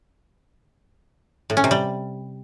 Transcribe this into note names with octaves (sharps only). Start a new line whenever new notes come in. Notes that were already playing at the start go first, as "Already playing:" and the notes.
A2
C#4
C3
G3